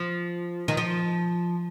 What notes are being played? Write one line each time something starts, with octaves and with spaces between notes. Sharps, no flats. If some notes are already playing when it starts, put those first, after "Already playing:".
Already playing: F3
D#3
F3